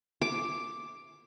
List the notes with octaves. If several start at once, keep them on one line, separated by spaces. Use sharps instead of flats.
D6